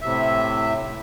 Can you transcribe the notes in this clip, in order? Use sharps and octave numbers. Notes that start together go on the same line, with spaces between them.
A2 C3 E5